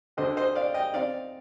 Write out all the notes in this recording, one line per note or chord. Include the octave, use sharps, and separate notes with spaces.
D2 D3 A3 D4 C5 D#5
C5 D#5
D5 F5
D#5 G5
C4 D#4 D5 F5